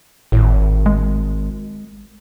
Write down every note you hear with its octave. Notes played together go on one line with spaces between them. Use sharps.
G#1 A2
G#3